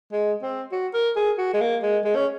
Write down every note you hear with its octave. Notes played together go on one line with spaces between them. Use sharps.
G#3
C4
F#4
A#4
G#4
F#4
G#3
A#3
G#3
G#3
C#4